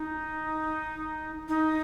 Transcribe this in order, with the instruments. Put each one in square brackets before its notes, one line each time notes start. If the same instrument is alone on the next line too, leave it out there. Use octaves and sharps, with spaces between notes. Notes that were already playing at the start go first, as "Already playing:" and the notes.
Already playing: [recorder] D#4
D#4